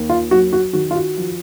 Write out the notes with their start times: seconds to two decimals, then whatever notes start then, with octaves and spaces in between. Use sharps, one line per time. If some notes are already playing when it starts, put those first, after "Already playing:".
Already playing: D#2
0.10 F4
0.31 F#3 F#4
0.53 F#4
0.73 D#3 F#4
0.91 F4
0.95 F#4
1.17 F3